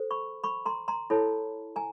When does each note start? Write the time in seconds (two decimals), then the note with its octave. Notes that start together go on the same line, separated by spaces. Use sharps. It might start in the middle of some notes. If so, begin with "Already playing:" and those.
Already playing: A4 C5
0.11 B5 C#6
0.44 B5 C#6
0.66 A#5 C6
0.88 A#5 C6
1.10 E4 A4 C#5 A5 B5
1.76 G#5 A#5